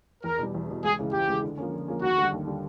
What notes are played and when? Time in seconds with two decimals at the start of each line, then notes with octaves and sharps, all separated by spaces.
0.24 E2 A#4
0.39 B2 G3
0.55 E2
0.69 B2 G3
0.84 C#2 G#4
0.99 C#3 E3 G#3
1.13 C#2 G4
1.28 C#3 E3 G#3
1.43 D3
1.58 F3 A#3 C#4
1.73 D3
1.88 F3 A#3 C#4
2.02 D#2 F#4
2.17 D3 G3
2.32 D#2
2.47 D3 G3